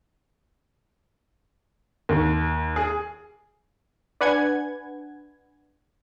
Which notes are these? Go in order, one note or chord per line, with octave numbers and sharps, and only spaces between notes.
D#2
G#4
D4 B4 F#5 G#5 G#6